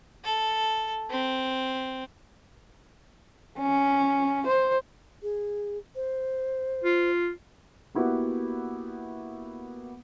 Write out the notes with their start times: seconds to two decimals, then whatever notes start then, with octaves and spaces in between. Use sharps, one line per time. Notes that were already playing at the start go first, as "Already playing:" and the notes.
0.24 A4
1.11 C4
3.58 C#4
4.46 C5
5.23 G#4
5.96 C5
6.84 F4
7.95 A#3 B3 E4 F#4 G4 B4